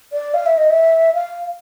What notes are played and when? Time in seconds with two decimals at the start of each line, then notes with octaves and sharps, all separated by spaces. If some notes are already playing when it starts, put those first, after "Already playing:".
0.13 D5
0.34 F5
0.46 E5
0.58 D#5
0.70 E5
1.14 F5